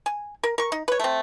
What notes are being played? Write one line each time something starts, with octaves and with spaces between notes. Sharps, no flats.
G#5
A#4
A#4 C#6
D#4
B4 C#5
A3 C4